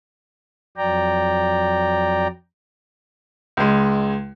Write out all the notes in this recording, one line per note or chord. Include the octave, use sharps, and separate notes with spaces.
F2 F#3 D5 G5 A#5
C#2 G#3